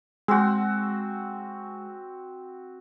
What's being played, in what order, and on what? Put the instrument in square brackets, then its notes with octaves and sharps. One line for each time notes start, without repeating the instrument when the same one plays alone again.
[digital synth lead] G#3 [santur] C4 F#4